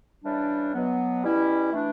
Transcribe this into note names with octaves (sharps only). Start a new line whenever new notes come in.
C#3 E3 G3 D4
B2 F#3 B3
B2 G3 C#4 E4
E3 A3 D4